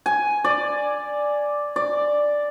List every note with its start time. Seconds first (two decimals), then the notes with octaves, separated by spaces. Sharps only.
0.06 G#5
0.44 D5
1.76 D5